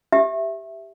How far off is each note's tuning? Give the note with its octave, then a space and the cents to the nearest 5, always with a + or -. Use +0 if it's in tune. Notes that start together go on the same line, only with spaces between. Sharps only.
G4 +0 E5 +0